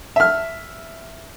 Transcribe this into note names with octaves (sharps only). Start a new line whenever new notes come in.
E5 F6